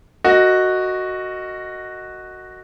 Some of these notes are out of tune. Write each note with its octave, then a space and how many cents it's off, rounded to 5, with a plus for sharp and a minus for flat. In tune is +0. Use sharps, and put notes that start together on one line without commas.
F#4 +0 A#4 -30 D#5 +0